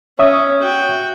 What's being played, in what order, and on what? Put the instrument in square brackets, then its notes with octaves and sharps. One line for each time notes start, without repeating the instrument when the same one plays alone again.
[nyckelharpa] C#4 [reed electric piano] C#5 E5 D#6
[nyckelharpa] F#4 G5